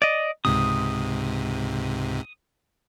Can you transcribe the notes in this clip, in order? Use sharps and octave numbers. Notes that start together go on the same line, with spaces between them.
D5 D#5
C#2 G#2 C3 D#6